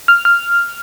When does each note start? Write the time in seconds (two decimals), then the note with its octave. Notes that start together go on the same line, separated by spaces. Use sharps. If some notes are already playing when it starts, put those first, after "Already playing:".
0.08 F6
0.25 F6